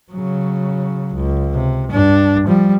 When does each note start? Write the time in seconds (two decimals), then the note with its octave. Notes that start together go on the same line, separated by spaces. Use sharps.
0.12 C#3 F#3
1.14 C#2
1.54 C3
1.90 G2 D4
2.46 F3 G3